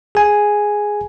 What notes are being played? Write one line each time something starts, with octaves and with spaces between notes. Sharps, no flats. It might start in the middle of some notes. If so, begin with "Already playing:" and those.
G#4 G#5